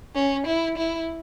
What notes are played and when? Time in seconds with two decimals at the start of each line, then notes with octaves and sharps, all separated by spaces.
0.15 C#4
0.46 E4
0.77 E4